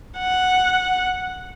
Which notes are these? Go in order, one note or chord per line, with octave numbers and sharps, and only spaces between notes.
F#5